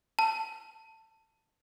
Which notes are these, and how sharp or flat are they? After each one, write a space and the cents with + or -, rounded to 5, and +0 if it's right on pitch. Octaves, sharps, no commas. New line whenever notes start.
A5 +15